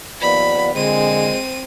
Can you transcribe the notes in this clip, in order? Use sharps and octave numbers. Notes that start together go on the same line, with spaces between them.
D#2 F3 B3 D5 B5
A#1 D3 G#3 C4 D#7